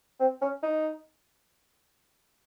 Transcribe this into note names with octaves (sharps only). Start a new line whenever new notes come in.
C4
C#4
D#4